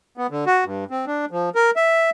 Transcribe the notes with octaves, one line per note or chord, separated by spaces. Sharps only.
B3
D3
F#4
G2
C4
D4
F3
A#4
E5